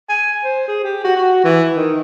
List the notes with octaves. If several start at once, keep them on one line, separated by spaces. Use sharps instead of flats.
G#5
C5
G#4
G4
F#4
F#4
E3
D#3